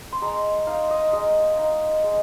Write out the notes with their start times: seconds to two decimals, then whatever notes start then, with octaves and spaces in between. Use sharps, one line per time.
0.12 C6
0.22 G#3 A#5
0.67 D#4 F5
0.91 D#5
1.13 G#3 D#5
1.58 D#4
2.04 G#3